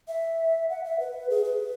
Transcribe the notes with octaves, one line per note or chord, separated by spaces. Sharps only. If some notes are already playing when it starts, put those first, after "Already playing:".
E5
F#5
E5
B4
G#4
B4